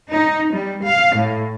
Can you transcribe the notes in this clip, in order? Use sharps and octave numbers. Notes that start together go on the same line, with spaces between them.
D#4
G3
F5
A2